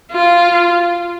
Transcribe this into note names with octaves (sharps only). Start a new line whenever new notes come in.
F4